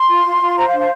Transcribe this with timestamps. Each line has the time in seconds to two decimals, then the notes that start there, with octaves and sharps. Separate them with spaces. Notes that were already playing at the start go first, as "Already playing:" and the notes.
Already playing: C6
0.08 F4
0.24 F4
0.40 F4
0.57 C5 A#5
0.67 F5
0.72 D4
0.78 F5